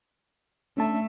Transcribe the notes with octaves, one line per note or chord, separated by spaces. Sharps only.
A3 C#4 D4 E5 A5